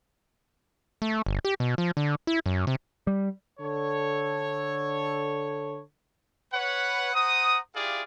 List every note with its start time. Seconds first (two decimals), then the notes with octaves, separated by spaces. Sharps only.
1.02 A3
1.26 G1
1.45 G4
1.60 B2
1.78 F3
1.97 D3
2.27 E4
2.46 F#2
2.67 C3
3.07 G3
3.60 D3 A4 C#5
6.53 B4 C#5 F#5
7.14 C5 F#5 A#5 D#6
7.75 E4 F4 G4 G#4 D5 F5